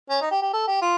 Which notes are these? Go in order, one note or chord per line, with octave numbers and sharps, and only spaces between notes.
C#4
D#4
G4
G4
A4
G4
F4